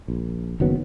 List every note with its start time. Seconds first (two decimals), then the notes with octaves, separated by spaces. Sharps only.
0.08 A#1
0.60 F#1 D#3 F#3 B3